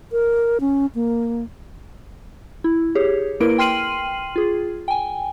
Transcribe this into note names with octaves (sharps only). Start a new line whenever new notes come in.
A#4
C#4
A#3
E4
G4 G#4 C#5
A#3 E4 A#4 B4 D7
G5 C6 F6 C7 D#7 F#7
F4 G#4
G5 G#5